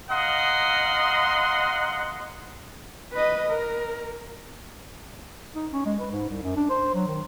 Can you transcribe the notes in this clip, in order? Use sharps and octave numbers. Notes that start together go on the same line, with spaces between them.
D#5 F5 F#5 A#5 C6 D#6
B4 D#5
A#4
D#4
C#4
G#3
B4
G#2
C2
F#2
D4
C5
F#3
D#3